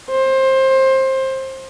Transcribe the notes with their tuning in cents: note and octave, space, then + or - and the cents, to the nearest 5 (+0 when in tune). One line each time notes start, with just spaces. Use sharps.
C5 +20